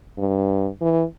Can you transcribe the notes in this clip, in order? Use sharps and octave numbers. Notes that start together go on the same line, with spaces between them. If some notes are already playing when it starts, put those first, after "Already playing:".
G2
E3